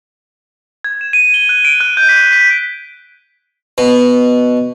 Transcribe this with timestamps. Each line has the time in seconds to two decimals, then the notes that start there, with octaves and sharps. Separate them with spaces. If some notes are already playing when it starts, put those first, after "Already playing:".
0.84 G#6
1.01 E7
1.13 D#7
1.34 G7
1.49 F#6
1.65 D7
1.80 F#6
1.97 G6
2.09 B6
2.33 B6
3.78 B2